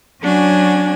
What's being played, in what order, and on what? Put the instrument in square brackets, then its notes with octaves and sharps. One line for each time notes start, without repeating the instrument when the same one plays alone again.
[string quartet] F#3 C#4 D4 F#4 G#5